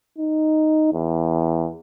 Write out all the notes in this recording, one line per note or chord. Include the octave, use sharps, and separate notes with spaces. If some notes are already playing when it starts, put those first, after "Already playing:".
D#4
E2